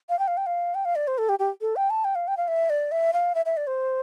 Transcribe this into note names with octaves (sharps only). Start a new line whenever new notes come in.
F5
G5
F5
G5
F5
G5
F5
D5
C5
A4
G4
G4
A4
G5
A5
G5
F5
G5
F5
E5
D5
E5
F5
E5
E5
D5
C5